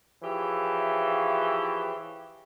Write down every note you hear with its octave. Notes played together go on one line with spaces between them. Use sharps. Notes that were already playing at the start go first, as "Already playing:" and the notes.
E3 F3 G4 G#4 C#5 E5